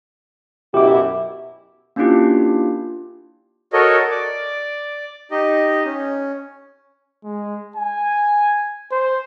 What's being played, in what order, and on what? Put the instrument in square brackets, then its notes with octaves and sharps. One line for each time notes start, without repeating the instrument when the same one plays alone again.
[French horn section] F#2 B2 E4 [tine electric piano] G4 D6
[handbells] A#3 C#4 D4 E4 F4 G4
[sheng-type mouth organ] F#4 A4 A#4 C#5 D#5
D5 D6
D#4 G4 D#5
C#4
[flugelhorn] G#3
G#5
C5